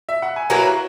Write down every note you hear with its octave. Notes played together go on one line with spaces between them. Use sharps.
E5
F#5
G#5
F#3 A#3 E4 B4 F#5 A#5